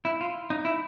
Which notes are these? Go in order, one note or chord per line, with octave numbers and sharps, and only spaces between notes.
E4
F4
D#4
E4